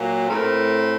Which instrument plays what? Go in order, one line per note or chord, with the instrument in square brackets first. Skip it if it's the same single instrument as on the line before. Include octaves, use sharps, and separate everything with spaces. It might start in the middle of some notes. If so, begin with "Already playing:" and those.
Already playing: [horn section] A#2 F#3 A#3
A2 A3 C4 A#4